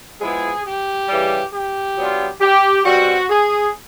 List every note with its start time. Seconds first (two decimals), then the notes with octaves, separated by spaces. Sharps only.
0.20 F3 G#3 B3 E4 G#4
0.65 G4
1.09 C#3 E3 G3
1.52 G4
1.97 F#3 B3 D4 F4
2.41 G4
2.85 B2 G3 C4 F#4
3.29 G#4